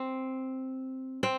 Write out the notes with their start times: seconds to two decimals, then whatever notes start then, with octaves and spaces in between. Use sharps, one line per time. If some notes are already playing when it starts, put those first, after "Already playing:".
Already playing: C4
1.23 C4